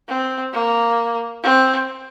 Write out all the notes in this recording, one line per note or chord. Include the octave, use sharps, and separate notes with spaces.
C4
A#3
C4